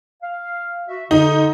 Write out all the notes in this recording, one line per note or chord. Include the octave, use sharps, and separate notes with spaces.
F5
F#4 E5
D3 D#4